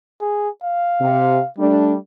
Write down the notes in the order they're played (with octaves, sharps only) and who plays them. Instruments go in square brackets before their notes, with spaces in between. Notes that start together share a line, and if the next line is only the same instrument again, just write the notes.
[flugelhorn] G#4
F5
[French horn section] C3
[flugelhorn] G3 [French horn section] A3 D4